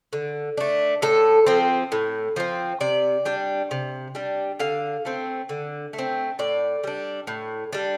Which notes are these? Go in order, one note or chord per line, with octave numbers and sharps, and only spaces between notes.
D3
A3 D4
A2 A4
F3 C4
A2
F3 C4
C3 D5
G3 D4
C3
G3 D4
D3 F5
A3 C4
D3
A3
C4
A2 D5
G3 D4
A2
G3 D4